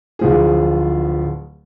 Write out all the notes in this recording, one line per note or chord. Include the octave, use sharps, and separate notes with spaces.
D1 F3 G#4